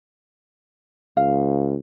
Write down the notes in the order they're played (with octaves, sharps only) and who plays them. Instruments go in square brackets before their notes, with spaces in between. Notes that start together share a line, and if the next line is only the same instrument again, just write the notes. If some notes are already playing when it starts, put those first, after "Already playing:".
[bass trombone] C#2 [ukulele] F5